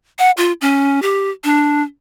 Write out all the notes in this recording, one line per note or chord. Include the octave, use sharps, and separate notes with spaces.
F#5
F4
C#4
G4
D4